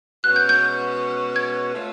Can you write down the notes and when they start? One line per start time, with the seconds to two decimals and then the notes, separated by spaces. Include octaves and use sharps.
0.24 B2 G#3 C#4 F#4 B4 F#6
0.36 G6
0.49 G6
1.36 G#6
1.73 A3 C4 F4 A4 C#5